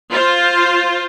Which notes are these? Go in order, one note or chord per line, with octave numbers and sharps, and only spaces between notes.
F4 C5